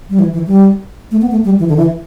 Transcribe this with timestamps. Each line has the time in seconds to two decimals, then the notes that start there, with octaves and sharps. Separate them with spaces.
0.10 G3
0.19 E3
0.33 E3
0.47 G3
1.11 A3
1.21 B3
1.31 A3
1.45 G3
1.59 E3
1.69 D3
1.77 E3